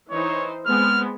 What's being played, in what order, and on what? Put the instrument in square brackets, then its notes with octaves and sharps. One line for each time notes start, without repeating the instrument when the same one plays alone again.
[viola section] E3 D#4 C5 [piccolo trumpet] C#5
[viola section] G#3 B3 C4 [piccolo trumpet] F6